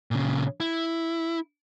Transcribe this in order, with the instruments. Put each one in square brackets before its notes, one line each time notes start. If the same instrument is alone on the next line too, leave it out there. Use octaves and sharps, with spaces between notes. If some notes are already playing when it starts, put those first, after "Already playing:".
[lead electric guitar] A#2 C#3
E4